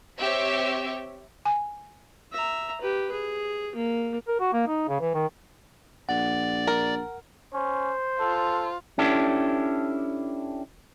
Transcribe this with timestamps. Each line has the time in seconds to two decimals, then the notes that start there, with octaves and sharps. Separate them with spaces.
0.19 C4 G4 C#5 E5
1.45 G#5
2.32 E5 A#5
2.81 G4 B4
3.12 G#4
3.75 A#3
4.28 A#4
4.40 F#4
4.53 A#3
4.68 D#4
4.89 C#3
5.01 E3
5.14 D#3
6.09 A#1 D5 F#5
6.67 A#4
7.54 C#4 C5
8.20 F4 A4
8.98 C#4 D4 E4 G4 A4